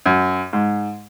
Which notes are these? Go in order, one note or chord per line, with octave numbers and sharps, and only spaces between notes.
F#2
G#2